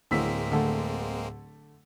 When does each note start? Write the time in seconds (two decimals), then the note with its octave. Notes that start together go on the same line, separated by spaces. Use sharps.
0.11 D1 A2 D3 G#3 A#3 C4 E6 B6
0.52 D3 A3